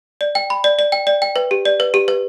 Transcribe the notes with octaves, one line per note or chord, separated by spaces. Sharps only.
D5
G5
B5
D5
D5
G5
D5
G5
B4
G4
D5
B4
G4
B4